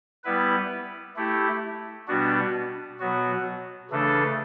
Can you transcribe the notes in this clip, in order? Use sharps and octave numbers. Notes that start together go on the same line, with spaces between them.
G3 B3 E4 B4
A3 E4 G4
B2 G3 B3 D4 F#4
B2 F#3 B3 F#4
C#3 E3 A3 D4 A4